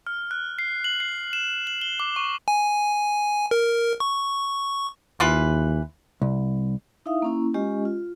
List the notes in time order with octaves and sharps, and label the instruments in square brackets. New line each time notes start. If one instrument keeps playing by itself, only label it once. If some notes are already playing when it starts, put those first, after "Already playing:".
[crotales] F6
F#6
C7
F#7
C7
E7
F#7
G7
D6
C#6
[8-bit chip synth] G#5
A#4
C#6
[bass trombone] D#2 [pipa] E3 F4 B4
[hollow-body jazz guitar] C2
[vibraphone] D#4 E4 E5 F5 D#6
A#3 C#4 E4
G#3 C#4 F4 G4 D#5
F4